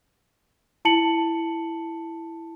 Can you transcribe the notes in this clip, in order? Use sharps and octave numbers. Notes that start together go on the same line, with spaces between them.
E4 A5 C#7 F#7